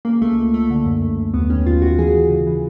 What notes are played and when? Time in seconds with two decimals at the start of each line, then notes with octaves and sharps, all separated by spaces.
0.05 C#3 A#3
0.21 C#2 A3
0.38 C#2
0.54 C#2 A3
0.70 D3
0.86 F#2
1.02 F#2
1.18 F#2
1.34 D#2 B3
1.50 D#3 C#4
1.66 D#2 F4
1.82 D#3 F#4
1.99 E3 G#4
2.14 E3
2.30 C#3
2.47 E3